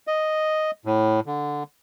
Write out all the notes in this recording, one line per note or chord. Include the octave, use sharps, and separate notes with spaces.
D#5
A2
D3